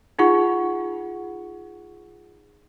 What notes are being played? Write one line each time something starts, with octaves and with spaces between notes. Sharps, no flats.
D#4 F4 G#4 F#5 C#6